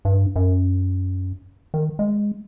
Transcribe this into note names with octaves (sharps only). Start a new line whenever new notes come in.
G2
F#2
D#3
G#3